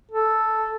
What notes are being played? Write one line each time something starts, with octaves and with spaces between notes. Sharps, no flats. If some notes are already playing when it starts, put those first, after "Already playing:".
A4